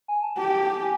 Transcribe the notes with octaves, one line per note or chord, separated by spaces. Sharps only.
G#5
A5
G4 A5
G#5